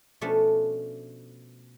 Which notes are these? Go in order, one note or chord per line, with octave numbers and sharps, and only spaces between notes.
B2 F3 A3 C#4 D4